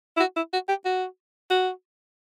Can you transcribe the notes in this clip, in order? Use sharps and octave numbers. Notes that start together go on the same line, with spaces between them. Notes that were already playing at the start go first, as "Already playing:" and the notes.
E4
F#4
E4
F#4
G4
F#4
F#4